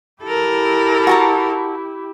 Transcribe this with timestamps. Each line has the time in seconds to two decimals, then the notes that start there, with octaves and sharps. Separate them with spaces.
0.24 E4 G4 A4 A#4
1.07 F#4 A5 A#5